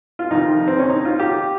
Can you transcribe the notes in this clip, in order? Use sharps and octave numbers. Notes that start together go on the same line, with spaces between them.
F4
F2 C3 D#3 D#4
C4
C#4
D#4
F4
G4